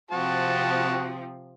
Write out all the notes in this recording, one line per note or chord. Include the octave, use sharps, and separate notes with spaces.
C3 F3 C4 F#4 A5